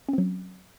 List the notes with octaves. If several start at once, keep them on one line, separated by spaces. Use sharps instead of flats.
F#3 C4 C#4